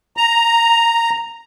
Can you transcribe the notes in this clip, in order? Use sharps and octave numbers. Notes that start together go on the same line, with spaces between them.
A#5